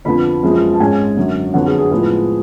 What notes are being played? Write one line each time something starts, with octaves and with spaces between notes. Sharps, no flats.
F2 D3 F3 B3 B5
F#2 F3 G#3 B3
A5
G#2 G#3 C#4 G#5
F#2 D3 F#3
F2 D3 F#3 B3 F#5
G#4
G#4
A2 F3 G#3 B3